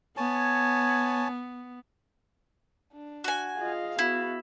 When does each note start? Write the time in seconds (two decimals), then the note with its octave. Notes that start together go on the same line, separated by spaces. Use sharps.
0.17 B3 C#5 G#5 A5
2.93 D4
3.24 F#4 G#5
3.57 F4 G#4 D#5 F5
3.99 B3 E4 F#4